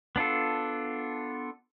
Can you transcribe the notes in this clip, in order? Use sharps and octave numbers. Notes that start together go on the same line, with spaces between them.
B3 D4 F4 A4